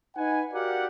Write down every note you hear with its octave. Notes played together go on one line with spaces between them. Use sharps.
D#4 B4 F#5 G#5
F#4 G4 A#4 D5 F5 F#5